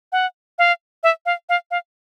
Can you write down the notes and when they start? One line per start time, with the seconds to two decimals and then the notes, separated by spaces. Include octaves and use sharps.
0.12 F#5
0.59 F5
1.03 E5
1.26 F5
1.49 F5
1.71 F5